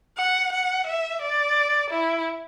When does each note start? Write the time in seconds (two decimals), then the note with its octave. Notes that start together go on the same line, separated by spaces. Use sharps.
0.17 F#5
0.52 F#5
0.87 E5
1.22 D5
1.90 E4